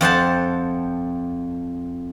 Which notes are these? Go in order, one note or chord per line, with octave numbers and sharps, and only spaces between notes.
F2 C5 F#5 A5